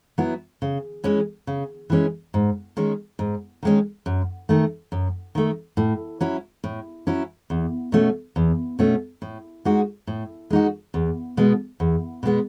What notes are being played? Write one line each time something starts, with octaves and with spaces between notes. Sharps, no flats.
F#3 B3 E4
C#3
E3 G#3 C#4
C#3
E3 G#3 C#4
G#2
D#3 G#3 C#4
G#2
D#3 G#3 C#4
F#2
D#3 A3
F#2
D#3 A3
A2
F#3 C#4 E4
A2
F#3 C#4 E4
E2
B2 A3 C#4
E2
B2 A3 C#4
A2
G#3 D#4 F#4
A2
G#3 D#4 F#4
E2
B2 G#3 B3
E2
B2 G#3 B3